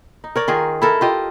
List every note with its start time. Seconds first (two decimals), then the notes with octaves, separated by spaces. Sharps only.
0.24 D#4
0.36 A#4 C#5 D5
0.48 D#3 F4 G#4
0.82 E4 A4 A#4
1.01 F4 G4 D#5